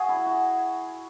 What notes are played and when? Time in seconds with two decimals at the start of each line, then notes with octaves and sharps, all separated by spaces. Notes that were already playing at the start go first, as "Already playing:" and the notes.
Already playing: F#4 G#4
0.09 E4
0.26 F#4